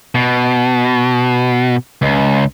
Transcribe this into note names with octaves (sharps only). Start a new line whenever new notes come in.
B2
C#2